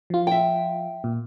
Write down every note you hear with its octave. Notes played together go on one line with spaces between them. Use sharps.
F3 F4
E5 G5
A#2